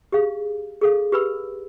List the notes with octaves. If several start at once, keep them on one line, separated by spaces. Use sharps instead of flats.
G4 G#4 F5
G#4 A4 F5
G4 B4 B5 E6